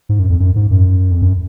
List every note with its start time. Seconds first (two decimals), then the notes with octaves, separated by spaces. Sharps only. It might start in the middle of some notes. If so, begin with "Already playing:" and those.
0.09 G#2
0.19 F#2
0.30 F2
0.40 F#2
0.56 G#2
0.71 F#2
1.11 F2
1.22 F#2